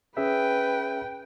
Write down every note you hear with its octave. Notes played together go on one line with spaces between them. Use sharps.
C#4 G#4 B4 E5 G5